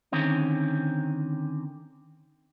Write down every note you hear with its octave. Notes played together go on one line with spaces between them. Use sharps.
D3 D#3 C4 C#4